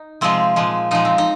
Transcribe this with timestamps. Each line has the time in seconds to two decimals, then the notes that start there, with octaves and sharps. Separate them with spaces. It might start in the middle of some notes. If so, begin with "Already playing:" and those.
Already playing: D#4
0.21 C3 F3 G#3 C4
0.56 A#2 F3 G#3
0.91 A#2 F3 G#3 D#4
1.05 C4
1.18 D#4